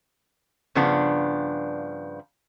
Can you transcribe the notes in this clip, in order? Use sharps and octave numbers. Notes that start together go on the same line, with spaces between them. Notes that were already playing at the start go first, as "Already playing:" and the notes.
G2 C#3 F3 B3 D4